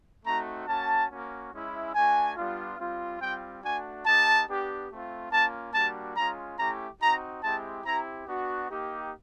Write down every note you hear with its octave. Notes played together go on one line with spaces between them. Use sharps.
A3 C4 D#4 F#4 A#5
A#3 C#4 F#4 A5
A#3 C#4 F#4
G#3 C#4 E4
A3 D4 F#4 G#5
G3 B3 D4 F4
G3 C4 F4
G3 C4 F4 G5
A3 D4 F#4 G#5
A#3 D#4 G4 A5
B3 D4 G4
A3 C4 F4
A#3 C#4 F4 A5
G3 A#3 D4 F#4 A5
G#3 C#4 F4 A#5
A3 C#4 E4 G4 A#5
C4 D#4 F#4 A#5
G#3 C4 E4 G4 A5
C4 E4 G4 A#5
B3 D4 F#4
A#3 D#4 G4